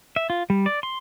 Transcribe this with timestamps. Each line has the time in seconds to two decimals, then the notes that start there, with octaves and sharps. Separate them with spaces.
0.16 E5
0.30 F4
0.50 G3
0.66 D5
0.83 C6